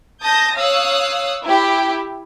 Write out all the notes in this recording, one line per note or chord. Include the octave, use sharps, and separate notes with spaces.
A5 D#6 G6 A#6
C#5 F5 D#6 E6 F#6
E4 G4